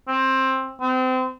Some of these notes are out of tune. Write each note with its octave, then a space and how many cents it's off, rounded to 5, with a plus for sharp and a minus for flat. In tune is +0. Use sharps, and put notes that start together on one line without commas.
C4 +15
C4 -30